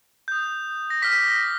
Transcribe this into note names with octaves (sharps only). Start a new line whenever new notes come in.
D#6 G6
A#6
D6 F6 B6
A#6